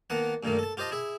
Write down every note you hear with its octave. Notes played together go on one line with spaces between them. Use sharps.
D#3 A#3 B3 F#5 A5
G2 A#2 D#3 A3 A#3
A4 A5
F4 G4 C5 D#5 A5
E4 G#4 E5